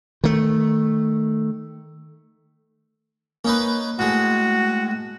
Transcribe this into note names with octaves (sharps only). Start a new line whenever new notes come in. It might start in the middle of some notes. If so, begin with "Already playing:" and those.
D#3 A3
A#3 C#4 D#4 B4
A2 G#3 F#4